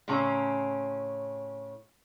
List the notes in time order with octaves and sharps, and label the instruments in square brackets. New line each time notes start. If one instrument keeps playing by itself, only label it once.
[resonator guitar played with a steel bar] A2 C#3 C4 C#4 A#5